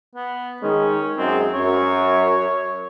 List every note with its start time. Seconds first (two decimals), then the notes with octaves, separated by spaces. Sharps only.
0.15 B3
0.62 D#3 G#3 C#4
1.17 F#2 G#3 C4
1.54 F#2 C#5